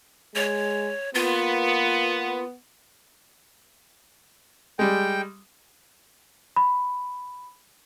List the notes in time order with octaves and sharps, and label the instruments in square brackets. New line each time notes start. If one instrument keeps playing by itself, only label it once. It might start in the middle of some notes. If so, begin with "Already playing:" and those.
[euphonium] G#3 [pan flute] C#5
[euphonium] A#3 [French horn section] B3 [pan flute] F4
[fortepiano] G3 G#3 [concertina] G5
[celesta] B5